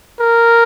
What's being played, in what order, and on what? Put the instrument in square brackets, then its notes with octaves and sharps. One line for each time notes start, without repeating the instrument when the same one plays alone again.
[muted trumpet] A#4